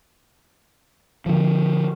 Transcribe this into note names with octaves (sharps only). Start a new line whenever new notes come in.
D3 F3